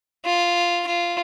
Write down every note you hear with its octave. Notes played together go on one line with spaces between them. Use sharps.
F4
F4